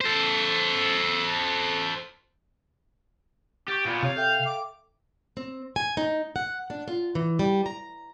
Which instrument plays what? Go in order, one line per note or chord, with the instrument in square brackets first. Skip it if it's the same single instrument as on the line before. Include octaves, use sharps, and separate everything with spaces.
[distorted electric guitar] A4 C5
[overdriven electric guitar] G4 [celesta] C#6 G6 A6
[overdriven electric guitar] A#2 B3
[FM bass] C3 [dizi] C#5 [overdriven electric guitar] F5
[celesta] A4 E5 G5 [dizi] G6
[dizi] D6
[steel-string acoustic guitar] C4
G#5
D#4
F#5
D4
F4
E3
G3
A#5